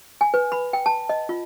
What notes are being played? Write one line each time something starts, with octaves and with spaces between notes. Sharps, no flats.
G#5
B4
B5
G5
A5
D#5
F4